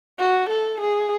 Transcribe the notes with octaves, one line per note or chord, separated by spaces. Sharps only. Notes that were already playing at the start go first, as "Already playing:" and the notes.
F#4
A4
G#4